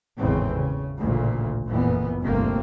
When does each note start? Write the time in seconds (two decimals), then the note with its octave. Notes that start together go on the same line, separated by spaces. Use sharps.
0.17 G#1 E2 A2 C#3 E3 C4
0.54 C#3
0.97 A1 D2 A#2 C#3
1.66 F#1 F2 A#2 E3 B3
2.22 G1 D2 C3 A3 A#3 C4